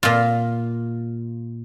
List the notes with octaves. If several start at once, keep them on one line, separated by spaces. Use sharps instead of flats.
A#2 F4